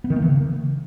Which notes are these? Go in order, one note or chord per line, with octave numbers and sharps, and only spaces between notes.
B3
D#3
A#3
E3
C#3